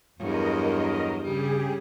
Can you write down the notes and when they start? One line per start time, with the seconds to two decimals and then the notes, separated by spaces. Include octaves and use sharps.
0.19 E2 G2 F#3 A#4 D#5
1.23 C#3 G3 G4 G#4